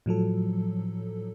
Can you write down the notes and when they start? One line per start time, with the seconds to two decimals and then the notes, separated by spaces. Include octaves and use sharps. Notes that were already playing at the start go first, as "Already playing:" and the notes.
0.06 A2 F3 F#3 A4